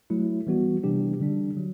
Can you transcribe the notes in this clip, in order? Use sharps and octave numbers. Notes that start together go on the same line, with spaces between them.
F#3 A3 E4
E3 G3 B3 F#4
C3 E3 G3 D4 G4
D3 G3 D4
F#3